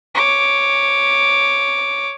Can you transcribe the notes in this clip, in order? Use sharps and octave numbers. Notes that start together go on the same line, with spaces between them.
C#5 D6